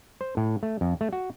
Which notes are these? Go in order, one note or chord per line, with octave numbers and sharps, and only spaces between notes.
C5
A2
A3
F2
A3
F#4